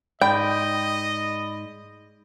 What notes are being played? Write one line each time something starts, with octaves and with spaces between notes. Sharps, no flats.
G#2 D5 D#5 G5 B5 G6